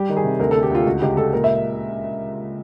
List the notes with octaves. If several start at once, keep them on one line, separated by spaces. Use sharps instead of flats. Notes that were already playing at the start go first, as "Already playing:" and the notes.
Already playing: G3 G4
D#3
G#4
C3
D2 A#4
A4
D2
G4
D2 F4
C#2 F#4
C#2 G4
C#2 A4
A#2 A#4
E5